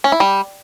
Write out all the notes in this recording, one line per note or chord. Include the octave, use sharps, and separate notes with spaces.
C#4
E4
G3